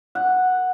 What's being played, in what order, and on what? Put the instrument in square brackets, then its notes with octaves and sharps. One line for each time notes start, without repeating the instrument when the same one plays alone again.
[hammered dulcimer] F#5